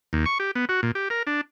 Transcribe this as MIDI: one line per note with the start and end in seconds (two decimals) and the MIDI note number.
0.13 0.25 39
0.26 0.38 85
0.40 0.51 67
0.55 0.65 59
0.69 0.81 66
0.83 0.91 46
0.95 1.08 67
1.10 1.23 70
1.27 1.41 62